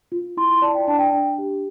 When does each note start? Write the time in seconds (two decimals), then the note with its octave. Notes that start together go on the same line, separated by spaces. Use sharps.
0.12 F4
0.37 E4 C6
0.50 C6
0.62 D5 A5
0.75 G5
0.87 D4 A5
0.99 G5
1.13 D4
1.38 G4